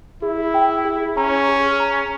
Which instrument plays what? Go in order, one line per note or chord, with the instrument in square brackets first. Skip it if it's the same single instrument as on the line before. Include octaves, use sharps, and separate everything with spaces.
[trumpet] E4 [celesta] G#4
[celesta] G5
G#4
[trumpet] C#4 [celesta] A#5
[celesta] G#4
A#5